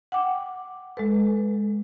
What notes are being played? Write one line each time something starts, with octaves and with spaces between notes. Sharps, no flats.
F#5 G5 D6
G#3 A4 B4